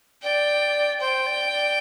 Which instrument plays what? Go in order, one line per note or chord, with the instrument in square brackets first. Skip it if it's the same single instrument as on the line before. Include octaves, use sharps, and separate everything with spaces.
[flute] D5 [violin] G5
[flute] C5 [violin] G5
[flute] D5
D5